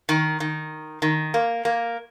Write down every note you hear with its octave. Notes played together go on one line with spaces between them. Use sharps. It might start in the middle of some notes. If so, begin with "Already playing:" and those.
D#3
D#3
D#3
A#3
A#3